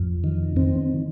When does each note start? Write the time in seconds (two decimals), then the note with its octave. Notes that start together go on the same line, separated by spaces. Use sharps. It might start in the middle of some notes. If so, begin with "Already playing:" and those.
Already playing: F2
0.24 D#3
0.56 D#3 C4